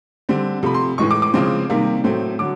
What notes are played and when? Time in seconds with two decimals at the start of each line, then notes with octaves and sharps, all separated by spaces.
0.29 D3 G3 C4
0.63 C3 F3 A3 B5
0.74 C6
0.98 A2 E3 G#3 C#6
1.11 D6
1.22 D6
1.34 C#3 F3 G#3 C4
1.70 C3 D#3 G3 A#3
2.04 A2 F#3 A3 C4
2.39 D3 F#3 D6